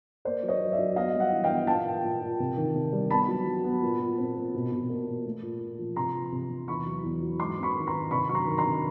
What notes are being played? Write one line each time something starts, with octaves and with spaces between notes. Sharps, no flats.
A#3 C5 D5
F#3
C#5 D#5
F#3
D5 E5
F#3
B3 D#5 F5
G3
E5 F#5
E3
F5 G5
B3
A#2 G5 A5
A#2
A#2
A#2
C3
D#3
C3
G3
B3 A5 B5
F#3
F#3
B3
A#2
A#2
C4
A#2
B2
B2
A#3
A#3
A3
A#2
A#2
F3
C3 A#5 C6
F3
C3
C3
E2 B5 C#6
F#3
E2
F#3
G#2 C6 D6
C4
B5 C#6
D#3
A#5 C6
D#3
C3 B5 C#6
F#3 C#6
A#5 C6
D#3
A#5 C6
C3